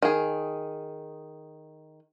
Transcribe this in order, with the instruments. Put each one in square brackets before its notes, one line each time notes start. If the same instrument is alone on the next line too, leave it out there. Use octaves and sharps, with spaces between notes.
[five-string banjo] D#3 G#4